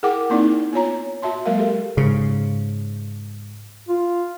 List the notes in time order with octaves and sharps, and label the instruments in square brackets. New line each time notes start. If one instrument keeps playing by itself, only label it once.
[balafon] E4 G#4 A#4 F#5 G5 D6
A#3 C4 D#4 E4 D5
B3 F4 C#5 A#5
F#4 E5 A5 C6
F#3 G#3 A#3 A#4 F5
G4 A4
[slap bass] G#2 C#3
[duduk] F4